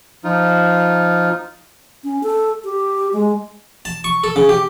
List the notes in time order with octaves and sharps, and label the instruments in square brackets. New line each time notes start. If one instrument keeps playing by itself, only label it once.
[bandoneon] F3 D#4 F4
[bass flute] C#4
A4
G4
G#3
[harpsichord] A5
C#6
A4
C#3
G4